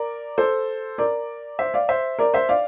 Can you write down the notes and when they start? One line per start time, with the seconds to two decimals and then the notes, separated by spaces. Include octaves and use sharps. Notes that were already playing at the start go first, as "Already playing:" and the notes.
Already playing: A#4 D5
0.38 A4 C5
0.98 A#4 D5
1.59 C5 E5
1.74 D5 F5
1.89 C5 E5
2.19 A#4 D5
2.34 C5 E5
2.49 D5 F5